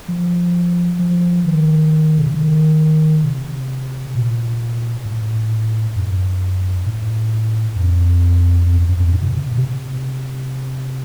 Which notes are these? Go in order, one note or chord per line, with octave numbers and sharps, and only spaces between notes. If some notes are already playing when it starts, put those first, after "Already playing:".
F3
F3
D#3
C3
C#3
D#3
C3
A#2
A2
F#2
A2
F2
F2
F#2
F#2
F2
A2
C3
C#3
A#2
C3